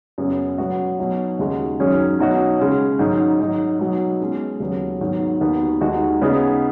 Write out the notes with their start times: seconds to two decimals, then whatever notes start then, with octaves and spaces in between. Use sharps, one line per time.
0.18 F#2 C#3 B3 G#4
0.58 B2 F#3 B3 F#4
0.99 B2 F#3 D#4 F#4
1.39 D#2 C#3 G#3 D#4 F#4
1.80 F#2 D#3 F#3 C#4 G#4
2.19 B2 F#3 D#4 F#4
2.59 C#3 G#3 C#4
2.99 G#2 D#3 F#3 D#4
3.40 G#2 F#3 D#4
3.79 B2 F#3 B3 D#4
4.20 B2 G#3 C#4 G#4
4.60 D#2 C#3 F#3 B3
5.01 G#2 D#3 F#3 B3
5.41 D#2 D#3 B3 F#4
5.81 D#2 D#3 G#3 D#4 F#4
6.22 C#3 B3 D#4 G#4